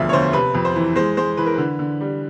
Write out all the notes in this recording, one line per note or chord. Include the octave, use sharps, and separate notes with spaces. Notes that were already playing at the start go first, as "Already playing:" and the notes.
Already playing: E1 D2 F3 E5 F5
C#5
D2 C5
C3 B4
F2
C5
E3
G#3 C5
G#3 C5
E3 B4
A#4
D3 B4
D3
G3